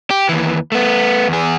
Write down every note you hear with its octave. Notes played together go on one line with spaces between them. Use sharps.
G4
D#2 E3
A3 B3
E2 G#4